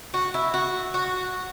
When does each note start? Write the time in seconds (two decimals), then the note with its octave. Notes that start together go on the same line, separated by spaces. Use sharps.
0.14 F#4
0.34 E4
0.54 F#4
0.94 F#4